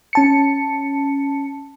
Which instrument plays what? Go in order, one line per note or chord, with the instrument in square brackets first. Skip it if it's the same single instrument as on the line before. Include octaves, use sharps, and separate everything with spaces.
[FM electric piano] C#4 A5 C#7